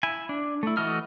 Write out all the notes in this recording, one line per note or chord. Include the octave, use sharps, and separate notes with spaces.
E4 G#5
D4
A3 E4
E3 A3 F#4 D#5 F6